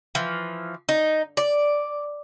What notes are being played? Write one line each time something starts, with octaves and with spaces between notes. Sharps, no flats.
E3 F3
D#4
D5